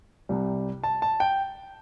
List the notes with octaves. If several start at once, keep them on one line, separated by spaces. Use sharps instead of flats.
C2 C3 G3
A5
A5
G5